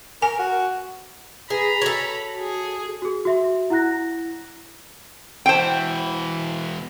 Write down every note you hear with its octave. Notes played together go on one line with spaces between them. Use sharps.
A#4 G#5
F#4
G#4 B4 A#5 B5
F#4 A4 C#5
G#4
F#4 G#4
F#4 E5 C6
E4 F#5 A#5 F#6 A#6
B2 E3 C5 G5